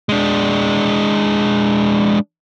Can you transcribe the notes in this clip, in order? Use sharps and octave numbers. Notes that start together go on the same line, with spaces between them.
G#3 D4